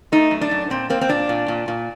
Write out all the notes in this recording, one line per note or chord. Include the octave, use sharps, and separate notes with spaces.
A3 D#4
F#2
D4
F#2
A#2 C4
A#3 C4
C4
A#2 D4
A#2
A#2
A#2